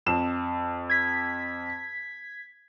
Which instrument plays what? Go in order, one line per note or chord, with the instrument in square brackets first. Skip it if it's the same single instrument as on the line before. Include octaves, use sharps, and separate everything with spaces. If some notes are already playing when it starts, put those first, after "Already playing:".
[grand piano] F2 E7
[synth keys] G#6 B6